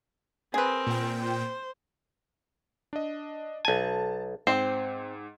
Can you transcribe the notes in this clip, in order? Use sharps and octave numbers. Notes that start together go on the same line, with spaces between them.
C4 G#4 A#4 B4
A#2 G5
C5
D4 D#5
B1 G#5 A5
G#2 C4 C5